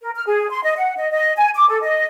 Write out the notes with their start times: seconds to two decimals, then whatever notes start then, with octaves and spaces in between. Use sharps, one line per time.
0.01 A#4
0.15 F6
0.27 G#4
0.50 C6
0.64 D#5
0.76 F#5
0.97 D#5
1.11 D#5
1.36 G#5
1.55 D6
1.69 A4
1.83 D#5